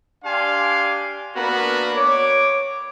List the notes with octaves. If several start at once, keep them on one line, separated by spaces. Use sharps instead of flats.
D4 G4 D5 F5 G#5 C6
A#3 B3 D4 F#4 A#4 B4
C#5 D6